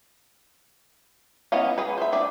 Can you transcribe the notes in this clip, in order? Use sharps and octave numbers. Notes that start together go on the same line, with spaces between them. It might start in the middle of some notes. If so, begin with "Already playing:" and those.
B3 C#4 E4 D#5 F5
G#4 B4
C5 E5
D4 D5 E5